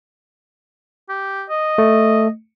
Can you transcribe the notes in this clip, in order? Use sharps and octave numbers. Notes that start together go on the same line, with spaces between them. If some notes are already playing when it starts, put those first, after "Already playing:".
G4
D#5
A3